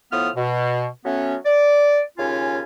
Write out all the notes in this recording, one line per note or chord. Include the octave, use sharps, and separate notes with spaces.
A2 F3 B3 D#6 F6
B2
F#3 A3 B3 C#4
D5
D#2 C#3 C#4 F4 G#5